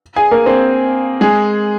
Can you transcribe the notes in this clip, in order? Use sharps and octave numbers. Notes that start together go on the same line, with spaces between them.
G#4 G#5
A#3 A#4
C4 C5
G#3 G#4